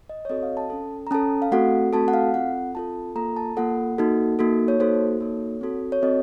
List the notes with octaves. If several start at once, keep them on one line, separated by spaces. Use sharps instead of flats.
D#5
C#5
C4 F#4 A4 D#5
F5
A5
C#4 A4
A#5
C#4 A4 A5
F5
A3 C4 F#4 A4 F#5
A3 C4 F#4 A4 A5
F#5
F5
C4 F4 A4 F#5
C4 F4 A4 A5
A#3 F4 A4 A#5
A5
A#3 F4 A4 F#5
A#3 D#4 F#4 A4
A#3 D#4 F#4 A4
C#5
A#3 D#4 F#4 A4 C5
A#3 D#4 F#4 A4 C#5
C4 F#4 A4
C#5
C4 F#4 A4 D#5